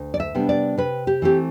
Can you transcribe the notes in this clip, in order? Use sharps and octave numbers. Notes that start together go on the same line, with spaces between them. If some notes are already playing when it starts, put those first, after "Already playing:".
Already playing: D2
D5
E5
C3 G3 B3 D4
D5
C3 B4
G4
E3 A3 C4 G4